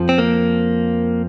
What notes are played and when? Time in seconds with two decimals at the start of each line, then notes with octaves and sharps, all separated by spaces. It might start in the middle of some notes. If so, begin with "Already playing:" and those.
Already playing: F2 F3
0.09 C4
0.18 A#3